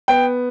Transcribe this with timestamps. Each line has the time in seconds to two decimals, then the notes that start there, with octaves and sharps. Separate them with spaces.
0.08 B3 G5